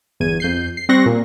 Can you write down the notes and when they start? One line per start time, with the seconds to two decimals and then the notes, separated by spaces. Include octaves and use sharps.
0.20 G1 E2 G#6 D#7
0.40 F2 G6 C7
0.77 C7
0.89 G3 C4 C6 C#6 F#6 A#6
1.06 A#2